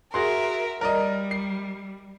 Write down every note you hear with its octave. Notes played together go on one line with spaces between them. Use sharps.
F#4 G#4 A#4 E5 C6
G3 A#4 D5 D#5
C7